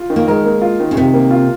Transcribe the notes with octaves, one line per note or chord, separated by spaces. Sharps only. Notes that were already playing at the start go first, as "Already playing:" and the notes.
Already playing: F4
D#3
A#3
G#3 A#4
A#3
F4
D#3
C#3
C3 D#3
A#3
F4